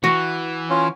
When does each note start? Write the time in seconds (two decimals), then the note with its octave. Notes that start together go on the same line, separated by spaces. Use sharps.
0.04 E3 F#4
0.70 C#4 F4